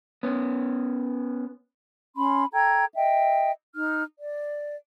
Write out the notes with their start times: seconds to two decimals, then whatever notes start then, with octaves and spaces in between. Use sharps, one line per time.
0.23 B3 C#4
2.16 C#4 B5 C6
2.53 A4 G5 A#5 G#6
2.94 D#5 E5 G5
3.75 D#4 F6
4.19 D5